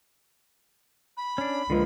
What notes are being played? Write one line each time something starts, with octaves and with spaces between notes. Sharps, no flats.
B5
C#4 D4
C#2 D3 F3 A#3